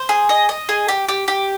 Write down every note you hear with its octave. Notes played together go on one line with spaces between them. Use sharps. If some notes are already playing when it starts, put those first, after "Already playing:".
Already playing: C5
G#4
D#5
D#5
G#4
G4
G4
G4